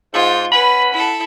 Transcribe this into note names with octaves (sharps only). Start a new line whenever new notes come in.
G#2 F4
C#4 B4 F#5 B5
E4 A4